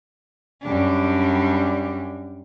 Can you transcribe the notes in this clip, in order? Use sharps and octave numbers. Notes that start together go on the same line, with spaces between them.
F#2 G3 D4